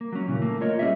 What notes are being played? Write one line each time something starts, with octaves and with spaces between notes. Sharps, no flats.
A#3
F#3 C#4
A#2 C#3 E3
A3 A#3
F4 A#4 C#5 D#5
G3 C#4 G#4 C#5 D#5 E5